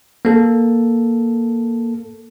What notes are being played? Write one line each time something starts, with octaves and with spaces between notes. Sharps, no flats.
A#3 A4